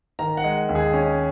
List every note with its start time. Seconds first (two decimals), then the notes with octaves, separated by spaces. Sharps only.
0.19 D#3 A#5
0.37 F#5
0.44 G#3
0.69 D#2
0.75 G#4
0.93 C#4